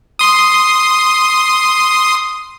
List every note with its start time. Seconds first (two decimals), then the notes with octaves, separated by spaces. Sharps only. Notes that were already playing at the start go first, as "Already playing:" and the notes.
0.19 C6 D#6